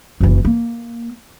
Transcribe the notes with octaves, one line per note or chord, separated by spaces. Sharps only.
F#1 E3
A#3